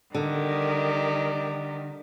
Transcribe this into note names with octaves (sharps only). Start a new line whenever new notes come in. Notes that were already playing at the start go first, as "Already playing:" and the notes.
D3 D#3 G3